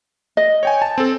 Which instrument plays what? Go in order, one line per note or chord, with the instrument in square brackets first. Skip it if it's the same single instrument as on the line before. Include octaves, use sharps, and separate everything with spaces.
[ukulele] D#5
[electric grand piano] C#5 G5 G#5
A5
C4 A4